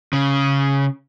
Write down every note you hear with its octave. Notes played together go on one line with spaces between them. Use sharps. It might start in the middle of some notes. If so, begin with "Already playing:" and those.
C#3